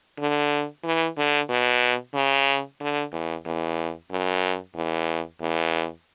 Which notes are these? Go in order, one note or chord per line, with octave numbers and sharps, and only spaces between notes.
D3
E3
D3
B2
C#3
D3
E2
E2
F#2
E2
E2